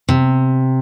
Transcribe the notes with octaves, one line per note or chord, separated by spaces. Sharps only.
C3